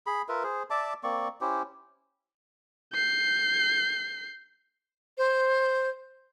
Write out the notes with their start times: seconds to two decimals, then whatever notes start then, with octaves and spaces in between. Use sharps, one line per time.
0.07 G#4 B5
0.29 F4 A#4 B4 E5
0.43 G#4 C5
0.70 D5 E5 A5 D6
1.03 A#3 C4 D5 C#6
1.41 C#4 E4 G4 C5
2.94 G6 C7
5.18 C5